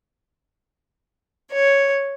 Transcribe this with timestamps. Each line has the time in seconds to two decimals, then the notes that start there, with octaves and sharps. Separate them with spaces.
1.52 C#5